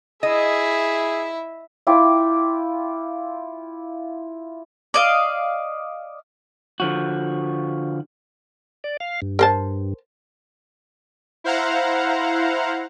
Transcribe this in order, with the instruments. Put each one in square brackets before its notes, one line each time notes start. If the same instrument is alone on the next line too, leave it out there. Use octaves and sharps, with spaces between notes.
[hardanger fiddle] E4 E5 [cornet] G#4 [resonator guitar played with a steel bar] D#5
[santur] E4 F4 G5 D6
[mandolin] D5 D#5 F5
[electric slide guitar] D3 F3 F#4
[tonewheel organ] D5
F5
G2
[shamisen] A#4 C5 A5
[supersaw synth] E4 C5 F5 F#5 A#5